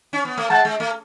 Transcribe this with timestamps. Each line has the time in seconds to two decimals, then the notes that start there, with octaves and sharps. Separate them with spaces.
0.13 C#4
0.25 B3
0.37 A3
0.50 G#3 F#5 A5
0.65 G#3
0.80 A3